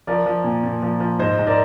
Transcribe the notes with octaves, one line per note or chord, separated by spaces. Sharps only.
F3 A#4 D5
F3
A#2
A#2
F3
F3
G#2 C5 D#5
G#2
A#4 D5